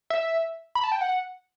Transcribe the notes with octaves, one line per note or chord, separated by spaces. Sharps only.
E5
B5
A5
G5
F#5